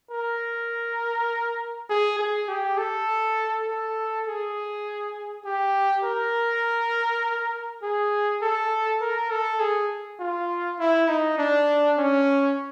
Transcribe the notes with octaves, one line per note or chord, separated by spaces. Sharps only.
A#4
G#4
G#4
G4
A4
A4
G#4
G4
A#4
G#4
A4
A#4
A4
G#4
F4
E4
D#4
D4
C#4